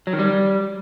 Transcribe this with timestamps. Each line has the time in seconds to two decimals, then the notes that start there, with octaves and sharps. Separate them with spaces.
0.07 F#3
0.13 D#3
0.19 G3